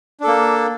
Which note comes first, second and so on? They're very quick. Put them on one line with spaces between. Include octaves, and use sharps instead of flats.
D4 A4 A#3